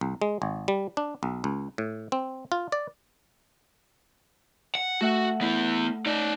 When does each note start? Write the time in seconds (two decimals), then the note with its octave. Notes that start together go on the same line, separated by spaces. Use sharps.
0.01 C2
0.22 G#3
0.42 G#1
0.68 G3
0.97 D4
1.23 B1
1.44 C#2
1.78 A2
2.12 C4
2.52 F4
2.72 D5
4.75 F#5
5.01 A3 F#4 E5 F#5
5.41 B3 E4
6.06 D#4 D5